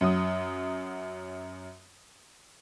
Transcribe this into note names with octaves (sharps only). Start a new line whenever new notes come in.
F#2 F#3 D#6